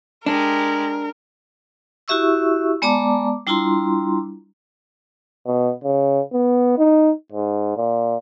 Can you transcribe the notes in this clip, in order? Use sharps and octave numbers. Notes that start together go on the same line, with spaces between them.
G#3 D4 G4 A#4
E4 F#4 G4 E5 C#6 E6
G#3 B3 D5 A5 A#5 D6
G3 D4 E4 F4 A#5 C6
B2
C#3
B3
D#4
G#2
A#2